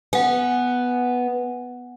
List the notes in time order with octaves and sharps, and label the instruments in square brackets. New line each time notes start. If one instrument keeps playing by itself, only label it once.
[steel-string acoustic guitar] B3 [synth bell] F#5 G#5